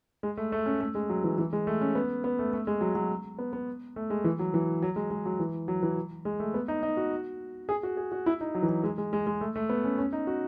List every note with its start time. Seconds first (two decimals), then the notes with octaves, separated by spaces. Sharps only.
0.23 G#3
0.37 A3
0.52 A3
0.66 C#4
0.81 A3
0.95 G#3
1.09 F#3
1.24 E3
1.38 E3
1.53 G#3
1.67 A3
1.81 C#4
1.95 B3
2.24 B3
2.39 A3
2.53 A3
2.67 G#3
2.81 F#3
2.95 F#3
3.39 B3
3.53 B3
3.96 A3
4.10 G#3
4.24 E3
4.39 F#3
4.54 E3
4.82 F#3
4.96 G#3
5.11 G#3
5.26 F#3
5.40 E3
5.68 F#3
5.83 E3
6.25 G#3
6.40 A3
6.54 B3
6.68 D#4
6.83 D#4
6.97 F#4
7.69 G#4
7.83 F#4
7.97 G#4
8.12 F#4
8.26 E4
8.41 D#4
8.55 F#3
8.63 E3
8.69 F#3
8.84 G#3
8.98 G#3
9.13 G#3
9.27 G#3
9.41 A3
9.56 A3
9.69 B3
9.84 C#4
9.98 C#4
10.13 D#4
10.27 F#4